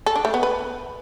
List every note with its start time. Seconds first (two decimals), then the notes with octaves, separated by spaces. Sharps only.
0.06 A4
0.16 D4
0.25 A3
0.34 B3
0.43 B4